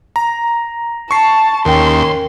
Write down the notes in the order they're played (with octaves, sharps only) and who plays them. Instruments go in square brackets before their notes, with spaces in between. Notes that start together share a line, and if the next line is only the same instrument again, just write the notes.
[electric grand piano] A#5
[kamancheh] A5 [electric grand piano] C#6 C7
[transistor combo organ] D#2 [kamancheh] C#4 C6 [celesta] A#4 G5